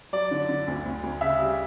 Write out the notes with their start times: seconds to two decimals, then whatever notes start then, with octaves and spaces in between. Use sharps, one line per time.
0.13 F#3 D5
0.31 D3
0.49 D3
0.68 D2
0.85 D2
1.03 D2
1.21 C#3 E5
1.39 G3